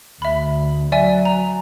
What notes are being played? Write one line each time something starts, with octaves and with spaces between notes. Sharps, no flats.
D2 E5 B5
F#3 D5 E5 G#5
A#5